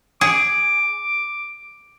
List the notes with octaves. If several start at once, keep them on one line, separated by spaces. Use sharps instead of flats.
G#4 D6